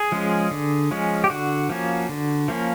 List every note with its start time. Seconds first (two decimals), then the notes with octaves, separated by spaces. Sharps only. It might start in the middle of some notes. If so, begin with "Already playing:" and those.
Already playing: G#4
0.12 F3 G#3 C#4
0.51 D3
0.91 F3 G#3 C#4
1.24 G4
1.30 D3 F#4
1.69 F3 A#3 C#4
2.09 D3
2.48 F3 A#3 C#4